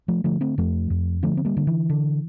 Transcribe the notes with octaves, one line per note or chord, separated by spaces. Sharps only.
F3 A3
D3 F3 A3
A3 C4
F2 F3 A3
F2
D3 F3 A3
C4
G3 A#3
D3
E3
D3